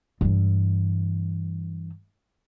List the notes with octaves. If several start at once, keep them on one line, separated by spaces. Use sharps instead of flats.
G2 E3